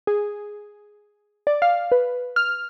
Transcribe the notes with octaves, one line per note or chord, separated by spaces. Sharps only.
G#4
D5
F5
B4
F6